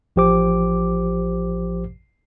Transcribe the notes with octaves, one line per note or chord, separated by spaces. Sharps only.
A1 F3 G4 C5 D6